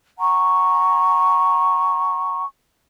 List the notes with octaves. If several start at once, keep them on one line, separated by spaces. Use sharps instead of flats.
F#5 G#5 A#5 C#6